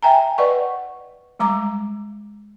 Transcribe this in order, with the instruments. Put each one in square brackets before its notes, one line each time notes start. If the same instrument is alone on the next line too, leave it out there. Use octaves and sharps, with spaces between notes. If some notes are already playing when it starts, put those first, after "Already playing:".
[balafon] E5 G5 G#5 A#5
B4 D5 D#5 F#5 C#6
G3 G#3 A#5 D6